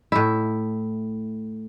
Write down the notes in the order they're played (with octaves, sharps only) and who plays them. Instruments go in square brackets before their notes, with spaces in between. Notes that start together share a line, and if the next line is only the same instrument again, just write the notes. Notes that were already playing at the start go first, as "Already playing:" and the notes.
[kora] A2 E4